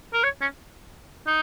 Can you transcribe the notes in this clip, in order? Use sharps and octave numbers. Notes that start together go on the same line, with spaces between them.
A#4
C#5
C#4
D#4